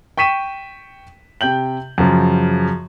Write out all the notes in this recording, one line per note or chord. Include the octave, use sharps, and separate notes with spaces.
G5 C#6 B6 D#7 E7
C3 G5 G6 F#7
F#2 C#3 F3